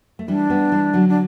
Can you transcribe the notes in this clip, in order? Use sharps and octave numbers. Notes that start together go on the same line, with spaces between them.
A3
E3 G3 D4
G3 B3
E3 G3
D3 F#3
D4